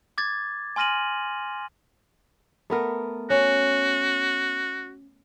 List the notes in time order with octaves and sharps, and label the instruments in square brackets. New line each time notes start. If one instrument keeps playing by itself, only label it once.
[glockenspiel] D6 G#6 A6
G#5 C6 F6 A#6 D#7 F#7
[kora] A3 B3 A#4
[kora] C#4 [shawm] F#4